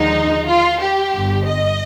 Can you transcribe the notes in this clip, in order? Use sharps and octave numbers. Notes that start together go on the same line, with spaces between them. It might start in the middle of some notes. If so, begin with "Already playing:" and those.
Already playing: D#2 D3 F3 G#3 D#4
F4
G4
G1 G2 D3
D#5